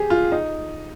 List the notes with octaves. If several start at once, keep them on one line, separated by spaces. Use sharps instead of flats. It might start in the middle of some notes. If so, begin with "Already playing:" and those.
Already playing: G4 G#4
F4
D#4